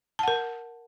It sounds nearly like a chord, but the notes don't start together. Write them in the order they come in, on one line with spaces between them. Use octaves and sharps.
A5 F#5 A#4